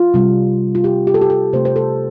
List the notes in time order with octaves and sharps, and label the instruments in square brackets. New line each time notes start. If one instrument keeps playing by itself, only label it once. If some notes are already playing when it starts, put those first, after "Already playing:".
Already playing: [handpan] F4
C3 G3
F4
G4
G4
A4
G4
A4
C3 A3 C5
C5
A4